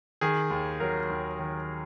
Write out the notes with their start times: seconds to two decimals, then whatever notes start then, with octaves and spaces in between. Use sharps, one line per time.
0.21 D#3 G#4
0.50 D#2
0.80 F#3 A#4
1.10 D#2
1.39 D#3